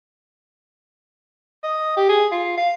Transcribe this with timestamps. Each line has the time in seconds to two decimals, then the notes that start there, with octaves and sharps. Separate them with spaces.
1.63 D#5
1.97 G4
2.09 G#4
2.32 F4
2.57 F5